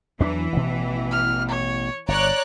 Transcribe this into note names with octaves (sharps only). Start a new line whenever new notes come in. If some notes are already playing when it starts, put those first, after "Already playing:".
E2 E3 F#3 D4
A1 B2
F6
C#5
G1 C#5 D5 A#5 F#6